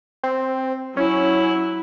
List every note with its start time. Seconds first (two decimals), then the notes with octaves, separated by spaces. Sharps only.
0.23 C4
0.97 F#3 C#4 E4